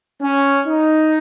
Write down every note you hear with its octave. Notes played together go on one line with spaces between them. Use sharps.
C#4
D#4